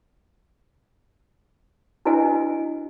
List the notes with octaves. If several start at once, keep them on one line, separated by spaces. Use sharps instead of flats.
D4 E4 F#4 B4 D#5 G#5